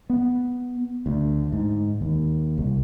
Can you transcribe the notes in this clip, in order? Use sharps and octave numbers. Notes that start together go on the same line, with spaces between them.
B3
D2
G#2
D#2
C2